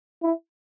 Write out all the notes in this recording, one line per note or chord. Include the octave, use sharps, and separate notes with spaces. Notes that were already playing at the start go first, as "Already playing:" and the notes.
E4